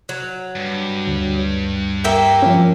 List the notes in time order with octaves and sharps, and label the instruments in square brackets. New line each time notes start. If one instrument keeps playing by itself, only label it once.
[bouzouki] F#3
[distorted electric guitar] G2
[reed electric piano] D2
[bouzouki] A#3 E5 G5
[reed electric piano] F3 C#4